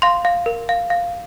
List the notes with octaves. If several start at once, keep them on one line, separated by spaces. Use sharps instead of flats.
F5 C6
F5
A#4
F5
F5